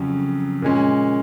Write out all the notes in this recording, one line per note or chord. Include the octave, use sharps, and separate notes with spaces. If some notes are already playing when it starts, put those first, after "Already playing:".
Already playing: F2 C#3 F#3 C#4
A#2 G#3 C#4